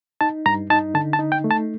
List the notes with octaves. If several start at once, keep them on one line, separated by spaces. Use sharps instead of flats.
D#4 A5
G2 A#5
D#4 A5
D3 A5
A5
D#4
G5
A3
A5